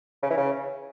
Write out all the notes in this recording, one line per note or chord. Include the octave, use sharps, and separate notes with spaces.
C#3
E3
C#3